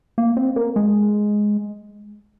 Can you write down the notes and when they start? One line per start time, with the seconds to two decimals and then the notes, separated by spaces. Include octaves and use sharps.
0.18 A#3
0.37 C4
0.56 A#3
0.76 G#3